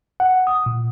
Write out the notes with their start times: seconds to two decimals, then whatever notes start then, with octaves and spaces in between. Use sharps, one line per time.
0.20 F#5
0.47 D#6
0.66 A#2